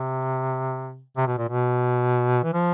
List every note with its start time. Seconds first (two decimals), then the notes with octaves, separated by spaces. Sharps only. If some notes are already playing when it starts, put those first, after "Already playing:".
Already playing: C3
1.17 C3
1.27 B2
1.38 A#2
1.48 B2
2.43 E3
2.54 F3